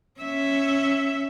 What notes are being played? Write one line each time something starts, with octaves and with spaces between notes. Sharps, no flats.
C#4 E5